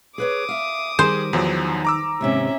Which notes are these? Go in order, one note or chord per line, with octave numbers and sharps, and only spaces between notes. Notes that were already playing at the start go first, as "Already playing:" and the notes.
G#4 B4 C#5 D6 D#6
E5 F5
D#3 G3 G#4 A#4 C5
E2 D#3 F3 F#3
A#5 D6 E6
D#2 G#2 C3 C#4 E5